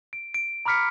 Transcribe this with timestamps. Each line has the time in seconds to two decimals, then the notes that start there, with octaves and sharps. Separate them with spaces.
0.13 D7
0.34 D7
0.65 A#5 B5 D6 F6 B6 C#7